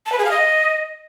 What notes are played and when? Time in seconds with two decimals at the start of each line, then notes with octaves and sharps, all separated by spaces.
0.06 A5
0.12 B4
0.18 G#4
0.25 F5
0.31 D#5